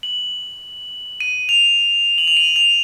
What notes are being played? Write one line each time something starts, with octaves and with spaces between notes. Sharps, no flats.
F#7
D#7
F7
F#7
F7
D#7
F7